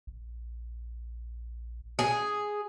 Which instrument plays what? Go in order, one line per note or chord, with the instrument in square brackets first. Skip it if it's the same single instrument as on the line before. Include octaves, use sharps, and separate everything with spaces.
[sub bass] A#1
[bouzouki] G#4